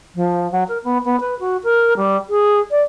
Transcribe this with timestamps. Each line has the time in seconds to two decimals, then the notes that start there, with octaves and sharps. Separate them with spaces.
0.15 F3
0.52 F#3
0.68 A#4
0.84 B3
1.05 B3
1.20 B4
1.40 F#4
1.64 A#4
1.97 G3
2.29 G#4
2.71 D5